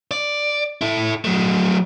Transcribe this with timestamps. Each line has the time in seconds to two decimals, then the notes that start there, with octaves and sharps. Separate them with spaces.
0.11 D5
0.81 E4 A4
1.25 F#3 A3